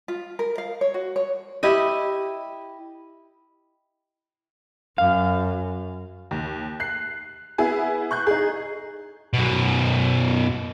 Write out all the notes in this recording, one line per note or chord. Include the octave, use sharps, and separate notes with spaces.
F4
A#4
F5
C#5
F#4
C#5
E4 G4 D#5
F#2 F5
D#2
F#6 C7
B3 E4 G#4 G#5
C#6 F#6 G6
D#4 G#4
F#2 B2